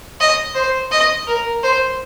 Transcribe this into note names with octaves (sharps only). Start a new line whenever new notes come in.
D#5
C5
D#5
A#4
C5